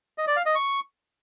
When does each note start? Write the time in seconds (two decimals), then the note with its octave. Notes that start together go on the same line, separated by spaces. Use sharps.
0.18 D#5
0.27 D5
0.37 F5
0.46 D#5
0.55 C#6